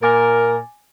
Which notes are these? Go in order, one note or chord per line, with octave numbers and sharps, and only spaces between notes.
A#2 A#4 G#5 D6 A6